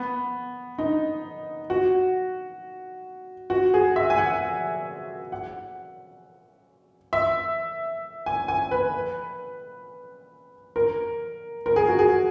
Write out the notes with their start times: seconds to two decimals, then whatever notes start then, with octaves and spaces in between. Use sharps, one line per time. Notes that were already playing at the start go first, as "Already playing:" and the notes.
Already playing: B3
0.78 D#4
1.70 F#4
3.50 F#4
3.74 G#4
3.96 E5
4.10 G#5
4.18 F#5
5.32 F#5
7.13 E5
8.26 G#5
8.48 G#5
8.71 B4
10.76 A#4
11.66 A#4
11.76 G#4
11.88 F#4
11.99 G#4